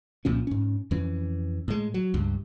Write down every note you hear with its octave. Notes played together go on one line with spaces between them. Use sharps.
C2 A#2 F3 C#4
G#2 C#4
F2 E3 C#4
A2 G#3
F#3
C#2 G2